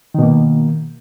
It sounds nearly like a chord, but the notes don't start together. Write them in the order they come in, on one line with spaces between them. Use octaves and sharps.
D#3 B2 A#3